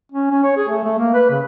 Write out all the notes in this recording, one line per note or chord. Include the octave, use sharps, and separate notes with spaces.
C#4
C#4
C#5
G#4
A3
A3
A#3
B4
C#3